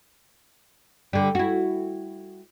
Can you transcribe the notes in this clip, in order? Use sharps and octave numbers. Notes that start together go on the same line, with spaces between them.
D3 G3
E4 F#4